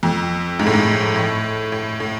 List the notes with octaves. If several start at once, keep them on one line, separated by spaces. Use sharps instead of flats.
F2
G#2
A2
G#2
A2
A2
A2